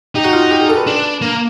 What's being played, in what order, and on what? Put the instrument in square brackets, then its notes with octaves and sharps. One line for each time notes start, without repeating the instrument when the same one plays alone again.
[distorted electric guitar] D#4 [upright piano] G4
[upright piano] F#4
F4
F#4
G4
G#4
A4
B4
[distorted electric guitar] D4
A#3